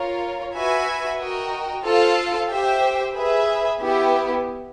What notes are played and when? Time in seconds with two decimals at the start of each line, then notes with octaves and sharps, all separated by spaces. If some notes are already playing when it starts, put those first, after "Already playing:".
Already playing: F4 A#4 C#5
0.56 F#4 B4 E5 G#5
1.20 F#4 A#4 D#5 G5
1.85 F4 A4 C5 F5 A5
2.50 G4 C5 E5 G5
3.15 G#4 B4 E5
3.80 B3 E4 G4